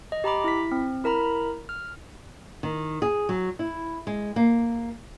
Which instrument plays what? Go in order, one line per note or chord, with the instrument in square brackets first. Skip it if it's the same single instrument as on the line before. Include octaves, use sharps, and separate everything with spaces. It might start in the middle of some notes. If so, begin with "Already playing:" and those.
[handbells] D#5
G4 A#5 B5 D6
E4 B6
C4
E4 A#4 A#5 B5
F6
[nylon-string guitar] D#3
G#4
F#3
E4
G#3
A#3